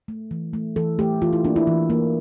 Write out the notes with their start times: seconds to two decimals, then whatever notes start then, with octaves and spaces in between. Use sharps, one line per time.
0.08 A3
0.31 E3
0.53 A3
0.76 E3 A4
0.99 A3 G4
1.22 E3 F4
1.33 E4
1.45 A#3 D4
1.56 E4
1.67 E3
1.90 A#3